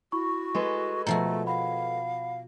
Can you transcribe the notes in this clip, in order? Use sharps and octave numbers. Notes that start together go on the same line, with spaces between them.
E4 F#4 B5 C#6
G#3 A4 B4
B2 F3 A3 F#4 A#5
F5 F#5 B5